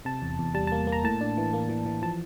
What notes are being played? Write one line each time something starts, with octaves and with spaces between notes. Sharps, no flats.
C3 A5
E2
E2
G3 A5
A5
A#3
A#3
A#5
A2 A5
D4
E3
A#3
E3
E3
F3 A5